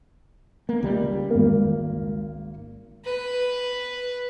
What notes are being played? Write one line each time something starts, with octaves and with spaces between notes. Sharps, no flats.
A#3
C#2 G3
G#1 A#3
B4